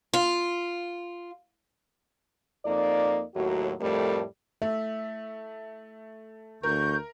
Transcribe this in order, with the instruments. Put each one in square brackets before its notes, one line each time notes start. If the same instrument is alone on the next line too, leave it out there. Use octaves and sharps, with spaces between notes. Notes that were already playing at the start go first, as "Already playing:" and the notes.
[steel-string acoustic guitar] F4
[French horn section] F2 A#3 D#4 D5
D#2 A2 F#3 F#4
F2 A2 G3 A3 G4 A#4
[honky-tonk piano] A3 [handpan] E5
[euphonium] D2 [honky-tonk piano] A#4 [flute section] C#6 G6